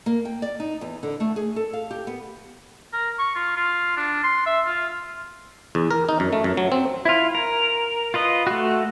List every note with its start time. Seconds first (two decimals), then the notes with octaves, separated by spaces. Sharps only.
0.06 A#3
0.25 G5
0.42 D5
0.60 D#4
0.81 E2
1.03 D3
1.20 A3
1.36 G#4
1.56 A4
1.73 F5
1.91 G4
2.07 B3
2.93 A#4
3.19 C#6
3.35 F4
3.56 F4
3.97 D4
4.23 C6
4.46 E5
4.65 F4
5.75 E2
5.91 A#4
6.09 D#4
6.20 F#2
6.33 A3
6.44 F#2
6.57 F#3
6.72 C4
7.05 E4 F4
7.35 A#4
8.14 F4 B4 D#5
8.47 A3 F#4